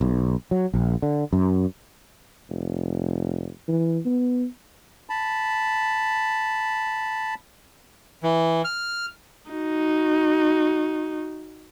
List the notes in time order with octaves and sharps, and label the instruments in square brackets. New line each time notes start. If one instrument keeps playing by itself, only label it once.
[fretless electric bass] B1
F#3
A#1
D3
F#2
[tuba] F1
E3
B3
[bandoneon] A5 B5
E3
F6
[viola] D#4 F#4